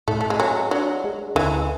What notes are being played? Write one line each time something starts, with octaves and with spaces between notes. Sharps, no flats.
A2 A3
A3
G#3
F#3 G#4
F#3 D4
G#3
D2 E3